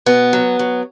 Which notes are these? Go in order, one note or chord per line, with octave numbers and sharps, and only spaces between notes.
B2 B3
F#3
F#3